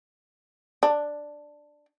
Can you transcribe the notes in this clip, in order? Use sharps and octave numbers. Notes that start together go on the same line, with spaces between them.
D4